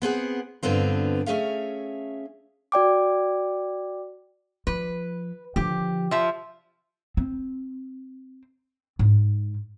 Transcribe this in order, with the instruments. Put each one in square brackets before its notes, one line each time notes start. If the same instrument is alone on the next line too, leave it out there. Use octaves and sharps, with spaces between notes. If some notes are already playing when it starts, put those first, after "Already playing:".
[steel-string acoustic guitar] B3 C4 G#4 F#5
G2 D3 B3 C4 F4
A3 C#4 G#4 E5 F5
[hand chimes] F#4 D5 G5 D6
[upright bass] F3 [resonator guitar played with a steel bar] B4
[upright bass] D3 F3 [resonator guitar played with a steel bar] G4
[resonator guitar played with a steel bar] F3 E5
[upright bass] C4
G#2